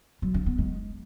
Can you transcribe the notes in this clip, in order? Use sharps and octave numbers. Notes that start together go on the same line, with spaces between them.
F#3
C#4
B3
G#3